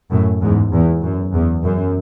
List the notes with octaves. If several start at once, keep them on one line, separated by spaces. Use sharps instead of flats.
F#2 A2
E2 G#2
E2
F#2
E2
F#2